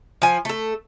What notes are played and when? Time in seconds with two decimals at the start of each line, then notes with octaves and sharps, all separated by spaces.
0.22 F3 G#5
0.45 A3 A4